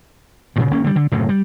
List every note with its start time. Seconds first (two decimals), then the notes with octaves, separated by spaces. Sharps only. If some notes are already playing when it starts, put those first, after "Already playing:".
0.56 G2 A#2 C#3
0.71 G#1 A#3 C#4
0.84 D3 G3
0.96 D3
1.12 F#1 F#2 A2 C3
1.29 G3